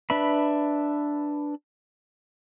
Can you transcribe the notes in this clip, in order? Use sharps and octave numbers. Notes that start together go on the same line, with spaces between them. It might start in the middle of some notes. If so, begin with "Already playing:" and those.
D4 B4 E5 B5